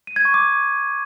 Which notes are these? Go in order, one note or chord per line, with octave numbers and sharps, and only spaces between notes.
D#7
G#6
C#6
D6